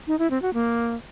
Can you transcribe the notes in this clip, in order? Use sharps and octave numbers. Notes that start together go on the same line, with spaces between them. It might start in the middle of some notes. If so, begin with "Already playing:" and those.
D#4
E4
C4
F#4
A#3